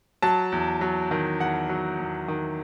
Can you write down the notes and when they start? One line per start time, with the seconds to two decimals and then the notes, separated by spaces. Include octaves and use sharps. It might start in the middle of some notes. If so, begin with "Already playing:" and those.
0.22 F#3 A5
0.52 E2
0.81 F#3
1.11 D#3
1.40 E2 F#5
1.69 F#3
1.99 E2
2.28 D#3